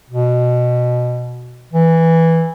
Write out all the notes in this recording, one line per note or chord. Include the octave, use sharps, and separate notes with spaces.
B2
E3